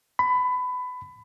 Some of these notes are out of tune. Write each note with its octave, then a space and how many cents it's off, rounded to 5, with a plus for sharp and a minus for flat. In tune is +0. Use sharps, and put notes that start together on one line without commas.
B5 +20